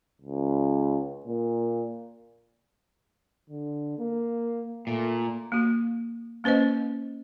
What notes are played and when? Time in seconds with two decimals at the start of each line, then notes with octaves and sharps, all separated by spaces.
0.21 C#2
1.26 A#2
3.49 D3
3.98 A#3
4.87 A#2 A3
5.52 A#3 F#4
6.44 A#3 C#4 B4 C5 D#5